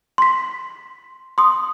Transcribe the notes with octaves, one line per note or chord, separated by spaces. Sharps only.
C6 B6
C6 D#6